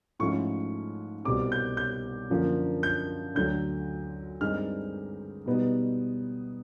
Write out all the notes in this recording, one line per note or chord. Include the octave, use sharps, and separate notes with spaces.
G#2 F3 A3 C#4 E4 C#6
C2 B2 G3 C4 D6
G6
G6
F#2 D3 F3 A#3 D4
G6
D2 D3 F#3 G6
G2 D#3 G#3 C4 D#4 F6
B2 G3 B3 D#4